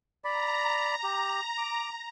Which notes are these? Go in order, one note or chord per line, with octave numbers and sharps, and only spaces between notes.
D5 A#5 B5
G4
D6